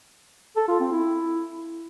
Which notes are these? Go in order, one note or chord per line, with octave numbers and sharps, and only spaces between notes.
A4
F4
C4
E4